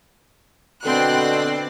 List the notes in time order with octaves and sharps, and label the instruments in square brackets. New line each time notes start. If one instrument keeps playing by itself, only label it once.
[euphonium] B2 [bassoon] D3 [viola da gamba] C4 D5 [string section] G5 C6 F#6